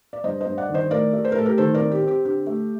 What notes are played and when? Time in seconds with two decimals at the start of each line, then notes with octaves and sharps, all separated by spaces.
0.13 D5
0.24 G2 C5 D#5
0.41 C5 D#5
0.47 G2
0.58 D5 F#5
0.68 D#3
0.74 C5 D#5
0.91 A2 A#4 D5
1.13 A3
1.25 C5
1.32 A#4
1.36 A2 A4
1.46 G4 A#4
1.58 D#3 A4 C5
1.74 A#4 D5
1.80 C4
1.92 G4
2.02 C4
2.08 G4
2.25 D3 G4
2.47 A3